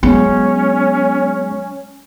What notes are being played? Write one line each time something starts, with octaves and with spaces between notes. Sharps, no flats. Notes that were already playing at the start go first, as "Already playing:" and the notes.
F#3 G#3 B3 C#4